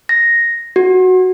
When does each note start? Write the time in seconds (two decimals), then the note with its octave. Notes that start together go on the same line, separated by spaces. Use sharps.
0.09 A#6
0.76 F#4